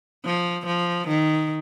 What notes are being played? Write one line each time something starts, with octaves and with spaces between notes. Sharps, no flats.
F3
F3
D#3